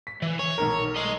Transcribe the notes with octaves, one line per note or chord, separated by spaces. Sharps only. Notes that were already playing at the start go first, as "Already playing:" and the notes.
B6
E3
C#5
B1 D#3 A#4
D#5 C6